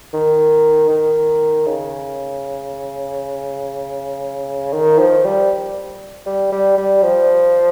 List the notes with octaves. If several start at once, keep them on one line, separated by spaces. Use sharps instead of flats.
D#3
D#3
C#3
D#3
F3
G3
G3
G3
G3
F3